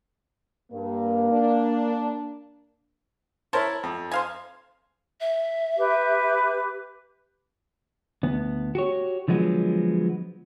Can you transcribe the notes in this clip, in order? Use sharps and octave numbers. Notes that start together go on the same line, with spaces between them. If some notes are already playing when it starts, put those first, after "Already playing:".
G2 A#3
D4
E4 A#4 C5 C#5 A5
F2
C5 F5 G#5
E5
G4 B4 D6
D2 B3
F#4 G4 C#5
D3 F3 F#3 G#3 B3